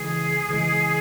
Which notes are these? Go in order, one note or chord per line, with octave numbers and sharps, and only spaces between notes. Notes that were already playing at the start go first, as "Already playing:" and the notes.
Already playing: C#3 E3 G#3 G#4
C#3 E3 G#3